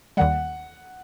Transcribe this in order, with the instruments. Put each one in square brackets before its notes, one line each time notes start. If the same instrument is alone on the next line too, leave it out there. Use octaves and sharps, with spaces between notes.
[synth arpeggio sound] D#2 D#3 G3 [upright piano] F#5